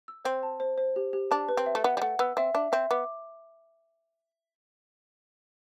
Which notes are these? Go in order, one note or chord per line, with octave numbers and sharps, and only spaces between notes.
E6
C4 C5
A5
C5
C5
G4
G4
D4 A5
B4
C4
E5
A3
B3 F#5
G3
A3 F#5
B3 E6
C4 E5
D4 E5
C4 E5
B3 D6